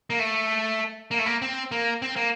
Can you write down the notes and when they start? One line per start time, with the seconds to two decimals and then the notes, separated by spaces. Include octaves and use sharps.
0.10 A#3
0.19 A3
1.11 A#3
1.19 A3
1.26 A#3
1.42 C4
1.72 A#3
2.02 C4
2.16 A#3